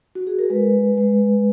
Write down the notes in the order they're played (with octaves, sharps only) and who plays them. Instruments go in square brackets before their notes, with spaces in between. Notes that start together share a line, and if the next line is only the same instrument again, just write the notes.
[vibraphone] F#4
G#4
A#4
G#3 B4
G#3